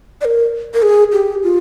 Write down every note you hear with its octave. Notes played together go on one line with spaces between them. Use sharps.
D5
A#4
A#4
G#4
G4
F4